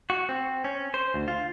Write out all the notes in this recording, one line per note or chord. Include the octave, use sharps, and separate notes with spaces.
F#4
C4
C#4
C5
D2
F4